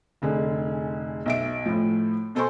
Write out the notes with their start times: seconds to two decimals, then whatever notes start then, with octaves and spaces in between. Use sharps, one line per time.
0.22 F1 D3 G#4
1.26 B1 E5 D7
1.66 A2 F3
2.35 B2 A4 C5 G#5 C6 C#6